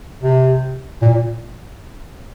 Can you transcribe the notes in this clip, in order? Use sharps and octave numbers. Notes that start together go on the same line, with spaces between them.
C3
A#2